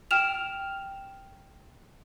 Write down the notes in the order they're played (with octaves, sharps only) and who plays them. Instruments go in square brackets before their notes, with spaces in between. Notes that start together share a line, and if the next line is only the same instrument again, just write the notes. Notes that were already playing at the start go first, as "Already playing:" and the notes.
[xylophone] G5 F6 E7 F7